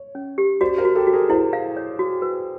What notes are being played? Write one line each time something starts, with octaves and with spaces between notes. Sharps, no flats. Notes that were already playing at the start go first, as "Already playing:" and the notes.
Already playing: C#5
C#4
G4
F#4 C5 D5
A#4 C5
F#4
G4 A4
F#4
G#4 A#4
E4 A#4 C5
F5
C#5
F#4
B4